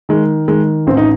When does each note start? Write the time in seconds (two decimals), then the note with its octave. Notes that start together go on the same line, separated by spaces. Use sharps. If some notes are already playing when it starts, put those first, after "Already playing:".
0.09 D#3 G#3
0.48 D#3 G#3
0.87 A1 C4
0.97 D#4